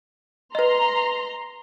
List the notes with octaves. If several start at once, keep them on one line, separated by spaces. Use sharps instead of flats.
B4 D#5 A#5 C6